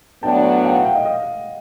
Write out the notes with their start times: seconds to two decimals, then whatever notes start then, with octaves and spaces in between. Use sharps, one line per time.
0.23 A2 F#3 B3 D4 G5 A5
0.64 F5 G5
0.74 E5 F#5
0.85 F5 G5
0.95 D#5 F5
1.05 D#5 F5